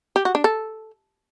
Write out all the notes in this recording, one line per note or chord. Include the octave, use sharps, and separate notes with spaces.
G4
F#4
D4
A4